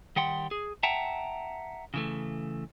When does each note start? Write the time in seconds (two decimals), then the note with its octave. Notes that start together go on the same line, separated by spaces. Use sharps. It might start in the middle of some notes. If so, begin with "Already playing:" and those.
0.16 D#3 G3 F#5 G5 C6
0.51 G#4
0.83 E5 F#5 G5 A5 A#5
1.94 C#3 E3 A3